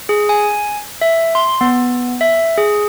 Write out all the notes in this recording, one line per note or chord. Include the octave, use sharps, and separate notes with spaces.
G#4
G#5
E5
C6
B3
E5
G#4